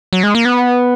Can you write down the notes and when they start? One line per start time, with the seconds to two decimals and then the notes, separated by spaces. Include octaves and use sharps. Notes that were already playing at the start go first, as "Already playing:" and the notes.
0.13 F#3
0.23 G#3
0.35 A#3
0.45 B3